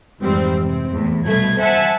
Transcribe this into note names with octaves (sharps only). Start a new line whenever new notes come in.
F2 G#2 E3 G3 C4
C3 C4
E2 A2
C2 B2 A3 G#6
C5 E5 F#5 G#5 A5